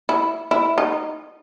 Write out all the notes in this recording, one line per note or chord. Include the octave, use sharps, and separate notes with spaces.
E4
E4
D#4